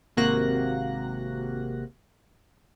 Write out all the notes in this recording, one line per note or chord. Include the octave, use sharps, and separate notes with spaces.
G#1 C3 A#3 F#4 F#6 A#6